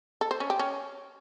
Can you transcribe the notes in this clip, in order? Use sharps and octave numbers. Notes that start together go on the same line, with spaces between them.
A4
C5
C#4
G4
C#4